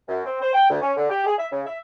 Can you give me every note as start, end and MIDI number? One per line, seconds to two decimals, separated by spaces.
0.08 0.23 42
0.25 0.41 60
0.42 0.53 72
0.53 0.69 79
0.69 0.81 38
0.82 0.92 61
0.97 1.08 50
1.10 1.22 67
1.26 1.33 68
1.38 1.46 76
1.51 1.62 49
1.66 1.78 76